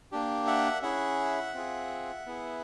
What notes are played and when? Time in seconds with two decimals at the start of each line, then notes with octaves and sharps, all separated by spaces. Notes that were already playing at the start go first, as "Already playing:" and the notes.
0.12 A#3 D4 G4
0.47 E5 F#5
0.82 C#4 E4 G#4 E5 F#5
1.54 C4 F4 G#4
2.26 B3 E4 G#4